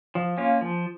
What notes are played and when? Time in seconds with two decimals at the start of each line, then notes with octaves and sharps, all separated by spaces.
0.15 F3
0.38 A#3 C#4 F4
0.61 F3